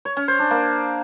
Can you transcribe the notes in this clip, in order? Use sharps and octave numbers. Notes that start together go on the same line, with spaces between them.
C#5
C#4
C5
D4
A#3